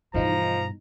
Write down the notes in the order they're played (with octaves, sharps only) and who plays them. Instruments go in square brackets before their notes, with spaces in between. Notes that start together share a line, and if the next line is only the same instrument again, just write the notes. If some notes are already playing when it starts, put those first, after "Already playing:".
[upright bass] G2 B2 [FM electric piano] E3 D#4 [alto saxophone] F3 [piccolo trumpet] A#5